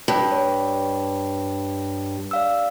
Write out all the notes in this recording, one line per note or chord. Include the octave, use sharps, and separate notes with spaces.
G2
C#5
D5 F5 E6